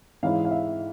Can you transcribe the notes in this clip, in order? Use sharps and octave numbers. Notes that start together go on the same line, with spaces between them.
G#2 E3 G#3 C#4 E4 F5
F5
E5